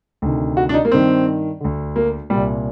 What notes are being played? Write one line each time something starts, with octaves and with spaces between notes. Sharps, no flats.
D2 C3 D#3
F#4
D4
D#4
A#3
G2 D#3 C4
D2 D3
A#3
C2 A#2 G3